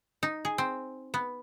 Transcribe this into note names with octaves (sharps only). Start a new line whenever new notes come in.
D#4
G#4
C4
B3